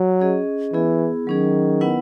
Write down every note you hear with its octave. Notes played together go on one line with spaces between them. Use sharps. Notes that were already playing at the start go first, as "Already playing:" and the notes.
Already playing: F#3
C#4 G#4 D#5
E3 B3 E4 G#4
D#3 F#3 C#4 G#4
B3 E4 B4 F#5